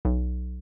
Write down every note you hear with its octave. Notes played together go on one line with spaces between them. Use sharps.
B1